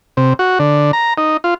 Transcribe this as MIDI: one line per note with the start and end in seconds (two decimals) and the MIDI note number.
0.17 0.33 48
0.39 0.59 66
0.59 0.91 50
0.93 1.14 82
1.18 1.37 63
1.44 1.54 65